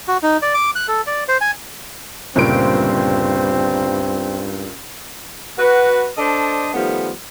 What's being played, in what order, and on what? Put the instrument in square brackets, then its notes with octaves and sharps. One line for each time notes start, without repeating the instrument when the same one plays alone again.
[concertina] F#4
D#4
D5
D6
F#6
A4
D5
C5
G#5
[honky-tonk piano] G1 C5 D7 [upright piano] C#2 A#2 [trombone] G2 [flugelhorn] C4
[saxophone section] F#4 B4
D4 A4 C5 D5 D#5
D#3 F3 G3 A3 B3